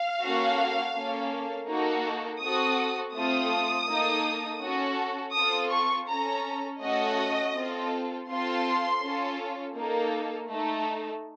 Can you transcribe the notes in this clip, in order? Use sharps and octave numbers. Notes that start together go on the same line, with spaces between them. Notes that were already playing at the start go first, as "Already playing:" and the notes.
Already playing: F5
A#3 C#4 F#4 A4
A#3 C#4 A4
A#3 D#4 F#4 A4
C4 F#4 A4 D#6
A3 C4 F4 A4 D#6
A#3 D#4 A4
C#4 F#4 A4
C4 F4 A4 D#6
C#6
C#4 A4 A#5
A3 C#4 F#4 A4 D#5
C4 F4 A4
C4 F4 A4 C6
C#4 F4 A4
A#3 D#4 A4
A3 D#4 A4